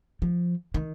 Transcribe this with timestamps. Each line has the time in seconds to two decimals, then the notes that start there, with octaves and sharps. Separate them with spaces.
0.22 F3
0.74 D#3